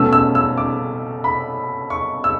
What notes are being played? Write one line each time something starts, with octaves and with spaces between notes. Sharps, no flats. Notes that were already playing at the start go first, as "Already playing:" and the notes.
Already playing: B2 A3 C#4 E6
E6
E6
D6
B5
C#6
E6